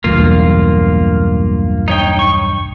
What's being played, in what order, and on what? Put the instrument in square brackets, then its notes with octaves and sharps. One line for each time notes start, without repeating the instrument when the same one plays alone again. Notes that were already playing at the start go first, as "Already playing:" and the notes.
[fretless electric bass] B1 E2 G2 [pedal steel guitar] A#3 F4
[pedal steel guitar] D#4 C#5 G5
C#6